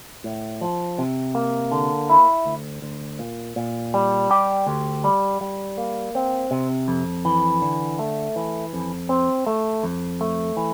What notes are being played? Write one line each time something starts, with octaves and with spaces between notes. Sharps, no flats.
A2
F3
C3
A#3
D3
E4
D2
D2
A#2
A#2
G3
G4
D2
G3
G3
A#3
C4
C3
F2
E3
D3
A3
E3
F2
C4
A3
F2
A3
E3